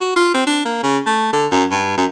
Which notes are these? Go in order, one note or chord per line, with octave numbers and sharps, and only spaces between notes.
F#4
F4
C4
D4
A#3
C#3
A3
D3
F#2
G2
F#2